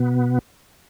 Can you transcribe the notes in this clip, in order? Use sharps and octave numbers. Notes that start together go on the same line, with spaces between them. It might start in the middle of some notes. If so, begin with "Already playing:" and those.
Already playing: B2 B3